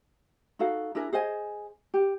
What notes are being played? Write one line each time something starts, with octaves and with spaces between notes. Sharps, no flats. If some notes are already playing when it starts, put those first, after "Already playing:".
D#4 F#4 A4 F5
D4 E4 G#4 A#4
G#4 C5 D#5 G#5
G4